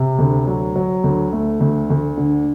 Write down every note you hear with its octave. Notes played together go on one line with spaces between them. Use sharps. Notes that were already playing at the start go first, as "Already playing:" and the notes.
Already playing: C3
D2
F#3
F#3
D2
A3
D2
D2
D3